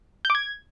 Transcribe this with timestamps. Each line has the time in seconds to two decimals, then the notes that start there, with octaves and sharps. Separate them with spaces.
0.25 G6
0.30 D6
0.35 G#6